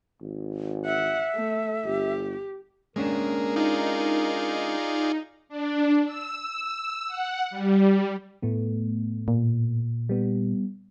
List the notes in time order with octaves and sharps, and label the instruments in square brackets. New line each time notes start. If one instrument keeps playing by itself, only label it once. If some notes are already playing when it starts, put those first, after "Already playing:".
[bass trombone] G#1
[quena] E5 [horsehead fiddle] F#5
[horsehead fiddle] A3
[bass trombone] G1 [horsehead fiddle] G4
[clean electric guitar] G#3 C#4 D4 [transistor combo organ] A#3 G#4 [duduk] A#4
[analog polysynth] D#4 [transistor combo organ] F4 G#4 D5
[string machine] D4
E6
F#5
G3
[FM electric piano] A2 A3 B3
[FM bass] A#2
[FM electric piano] G3 B3